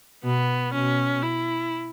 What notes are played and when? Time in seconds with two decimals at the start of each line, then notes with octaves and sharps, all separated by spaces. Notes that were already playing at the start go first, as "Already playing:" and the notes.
0.24 B2 B3
0.74 B2 C#4
1.22 E4